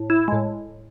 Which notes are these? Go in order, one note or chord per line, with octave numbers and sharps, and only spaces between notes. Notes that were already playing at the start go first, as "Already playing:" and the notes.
Already playing: A2
E4
A2 G#3